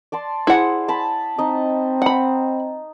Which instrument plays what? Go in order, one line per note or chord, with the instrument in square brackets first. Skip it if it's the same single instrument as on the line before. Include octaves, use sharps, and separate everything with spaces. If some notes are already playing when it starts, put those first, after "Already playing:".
[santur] D5 A5 C6
[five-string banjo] E4 F#5 [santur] G#4 C5
[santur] A5 B5
[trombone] C4 [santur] D#4 D#5
[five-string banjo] F#5 B5